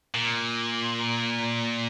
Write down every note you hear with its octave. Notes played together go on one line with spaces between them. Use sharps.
A#2